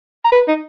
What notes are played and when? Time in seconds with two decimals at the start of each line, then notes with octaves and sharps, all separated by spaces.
0.25 A#5
0.32 B4
0.48 D#4